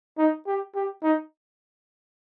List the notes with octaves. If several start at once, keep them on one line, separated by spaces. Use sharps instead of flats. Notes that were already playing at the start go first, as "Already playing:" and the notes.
D#4
G4
G4
D#4